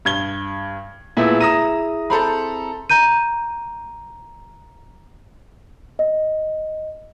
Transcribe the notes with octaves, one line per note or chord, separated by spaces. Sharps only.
G2 G#6 G7
A#2 A3 B3 E4 G#4 E5
A#5 D#6 A#6 D#7 E7
C4 A4 C5 A#5 B5
A#5 G6 D#7
D#5